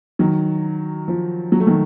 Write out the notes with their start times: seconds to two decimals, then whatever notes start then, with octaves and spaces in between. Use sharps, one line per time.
0.19 D#3 F#3
1.08 F3
1.52 F#3
1.60 A3
1.67 D#3 F#3